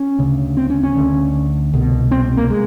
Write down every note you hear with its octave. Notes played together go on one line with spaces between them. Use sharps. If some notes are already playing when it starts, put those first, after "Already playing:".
Already playing: C#4
D2 C#3
C4
C#4
C#4
D2 D3
C2 B2
C4
A#3
G#3